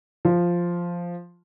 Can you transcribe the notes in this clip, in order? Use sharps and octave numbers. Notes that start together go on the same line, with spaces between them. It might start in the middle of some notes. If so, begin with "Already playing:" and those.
F3